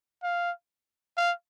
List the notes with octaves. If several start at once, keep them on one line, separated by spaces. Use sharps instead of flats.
F5
F5